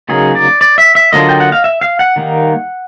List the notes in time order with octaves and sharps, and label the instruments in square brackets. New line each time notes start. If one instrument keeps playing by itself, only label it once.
[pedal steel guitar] C#3 F#3 A#3 D#4 G#4
D5
D5
E5
E5
D3 F#3 A#3 D4 F4 D#5
G5
F#5
F5
E5
F5
F#5
D#3 G3 A#3 D#4